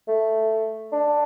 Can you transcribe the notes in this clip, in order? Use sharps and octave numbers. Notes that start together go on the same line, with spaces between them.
A3
D4